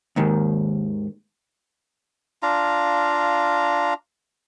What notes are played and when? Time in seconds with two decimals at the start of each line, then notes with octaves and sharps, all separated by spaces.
0.16 D#2 G#2 D#3
2.43 D4 F4 F5 A#5